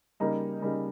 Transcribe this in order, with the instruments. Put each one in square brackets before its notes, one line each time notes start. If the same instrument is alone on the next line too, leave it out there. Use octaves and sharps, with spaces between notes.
[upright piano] C#3 G3 A#3 D#4 A#5
C#3 G3 A#3 D#4